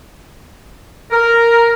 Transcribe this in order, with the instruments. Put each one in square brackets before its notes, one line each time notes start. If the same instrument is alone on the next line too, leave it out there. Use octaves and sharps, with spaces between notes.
[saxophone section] A#4